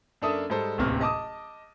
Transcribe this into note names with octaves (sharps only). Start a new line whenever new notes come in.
F#2 A#3 D4 A4 E5 D#6
G#2 G3 A4 C5
D1 A1 D#2 C3 F6
D#5 A5 D6 D#6